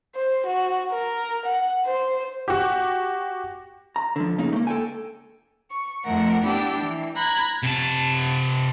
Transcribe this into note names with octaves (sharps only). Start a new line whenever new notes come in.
C5
F#4
A#4
F#5
C5
F#4 G4
A#5
D3 F3
C#3 A#3 D#4
A3 A#3
A4 G5 G#5
C#6
F2 A3 A#4 F#5
B3 D4 E4 G4
E3
A#5 B5 F#6 G#6
C3 A5